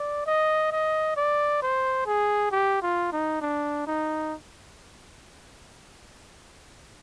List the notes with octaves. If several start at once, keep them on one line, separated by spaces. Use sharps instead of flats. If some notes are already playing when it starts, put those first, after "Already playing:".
Already playing: D5
D#5
D#5
D5
C5
G#4
G4
F4
D#4
D4
D#4